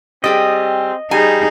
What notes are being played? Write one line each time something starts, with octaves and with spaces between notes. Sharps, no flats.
G3 C4 G4 G#4 D#5
G3 D#4 G#4 G#5